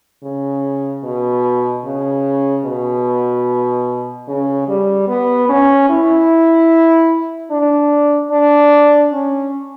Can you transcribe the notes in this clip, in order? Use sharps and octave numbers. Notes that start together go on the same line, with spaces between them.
C#3
B2
C#3
B2
C#3
G3
B3
C#4
E4
D4
D4
C#4